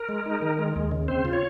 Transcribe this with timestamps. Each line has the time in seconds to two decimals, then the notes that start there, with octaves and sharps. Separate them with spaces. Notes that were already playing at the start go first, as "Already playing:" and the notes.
Already playing: A#4
0.09 G#3
0.26 D#4
0.42 D#3
0.59 G#3
0.76 D#2
0.91 C#3
1.08 C4 C5
1.25 F4
1.33 C#5